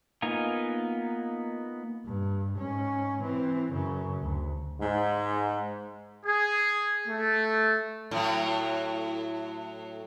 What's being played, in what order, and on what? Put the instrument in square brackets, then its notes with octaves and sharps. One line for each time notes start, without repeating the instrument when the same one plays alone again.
[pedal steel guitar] A#3 B3 D#4 F4 G#5
[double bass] G2
G#2 C#4
E3 C4
F#2 C#3
D2
[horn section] G#2
[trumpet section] G#4
A3
[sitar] A2 F#3